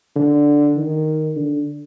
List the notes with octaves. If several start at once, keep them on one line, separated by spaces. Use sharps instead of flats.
D3
D#3
D3